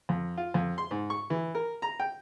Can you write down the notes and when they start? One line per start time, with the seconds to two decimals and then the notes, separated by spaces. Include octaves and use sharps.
0.09 F2
0.37 F4
0.54 F2
0.78 C6
0.91 G#2
1.10 C#6
1.30 E3
1.55 A#4
1.82 A#5
2.00 G5